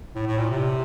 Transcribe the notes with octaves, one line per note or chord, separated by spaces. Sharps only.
A2
A2
A#2
C3